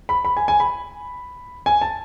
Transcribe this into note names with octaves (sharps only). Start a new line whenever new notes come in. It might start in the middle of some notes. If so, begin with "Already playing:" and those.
B5
B5
G#5
G#5
B5
G#5
A5